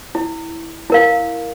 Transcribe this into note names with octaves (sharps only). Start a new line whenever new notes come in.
E4
E4 A#4 F5